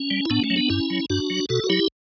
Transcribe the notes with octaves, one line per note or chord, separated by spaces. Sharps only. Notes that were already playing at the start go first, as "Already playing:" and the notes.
Already playing: C#4
G3
E4
A2 B3 D4
A3 C#4
F#3
B3 D4
G2 C#4 E4
F#3
G2 D4 F#4
F#3
B2 F#4 A4
F#4
F#3 E4 G4